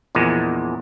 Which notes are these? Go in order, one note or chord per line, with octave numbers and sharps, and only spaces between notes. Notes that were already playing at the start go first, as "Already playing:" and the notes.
A#1 E2 A#2 G#3